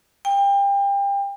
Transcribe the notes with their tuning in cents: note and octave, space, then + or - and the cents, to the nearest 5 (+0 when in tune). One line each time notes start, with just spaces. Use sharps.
G5 +30